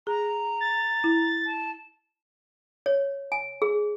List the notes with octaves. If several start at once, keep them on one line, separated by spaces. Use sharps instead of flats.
G#4 A#5
A6
E4
A5
C#5
G#5
G#4